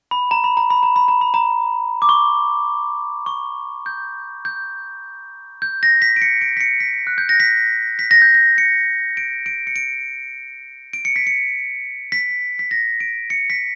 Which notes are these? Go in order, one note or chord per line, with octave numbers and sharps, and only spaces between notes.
B5
A#5
B5
A#5
B5
A#5
B5
A#5
B5
A#5
D6
C#6
C#6
G6
G6
G6
A#6
B6
D7
C#7
D7
B6
C#7
B6
F#6
G6
A#6
B6
B6
A#6
G6
A#6
C#7
D7
D7
C#7
D7
D7
C#7
B6
C#7
B6
B6
A#6
D7
C#7
B6